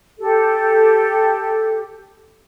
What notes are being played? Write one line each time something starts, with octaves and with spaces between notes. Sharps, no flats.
G4 A4